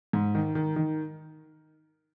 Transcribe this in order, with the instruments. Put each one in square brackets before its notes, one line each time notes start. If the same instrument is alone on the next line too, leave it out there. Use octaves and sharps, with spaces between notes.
[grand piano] G#2
D#3
D#3
D#3